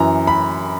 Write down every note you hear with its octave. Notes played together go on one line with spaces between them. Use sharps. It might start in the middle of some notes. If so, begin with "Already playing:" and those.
Already playing: F#2 E3 A#5
B5